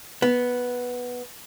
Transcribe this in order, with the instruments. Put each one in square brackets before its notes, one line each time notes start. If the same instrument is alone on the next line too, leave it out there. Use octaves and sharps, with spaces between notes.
[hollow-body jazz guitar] B3